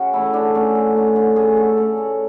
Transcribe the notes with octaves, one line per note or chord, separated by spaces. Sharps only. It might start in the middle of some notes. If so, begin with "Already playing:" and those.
Already playing: C#3 F#4
E3 A3 C#4 E4
D3 D4
A3 C#4
D3
A3 C#4
D3
A3 C#4 G#4
D3 A4
A3 C#4
C#3